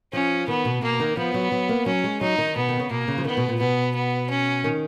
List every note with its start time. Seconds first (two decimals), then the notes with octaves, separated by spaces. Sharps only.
0.13 F3 C#4
0.48 D#3 B3
0.65 B2
0.82 B2 A#3
1.00 D#3
1.17 F3 B3
1.34 F#3
1.52 F#3
1.69 A#3
1.86 F#3 C#4
2.04 G#3
2.21 F#3 D#4
2.38 D#3
2.56 B2 B3
2.68 D#3
2.80 C#3
2.91 B2 A#3
3.08 C#3
3.18 F3
3.25 D#3 B3
3.37 B2
3.48 A#2
3.59 B2 B3
3.95 B3
4.29 C#4
4.64 D#3